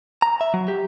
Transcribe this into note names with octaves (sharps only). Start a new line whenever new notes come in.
A#5
E5
F#3
G4